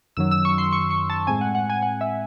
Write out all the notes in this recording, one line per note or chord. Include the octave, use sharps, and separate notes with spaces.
F#2 D#3 F#3 E6
E6
C#6
C6
C#6
C#6
A5
A5
A2 G#3 C4 G#5
F#5
F#5
G#5
F#5
E5